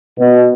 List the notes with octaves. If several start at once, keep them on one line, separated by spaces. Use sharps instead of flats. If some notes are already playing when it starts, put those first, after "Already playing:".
B2